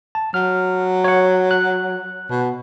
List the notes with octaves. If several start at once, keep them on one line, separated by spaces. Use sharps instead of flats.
A5
F#3 F6
C#5 F#5
F#6
B2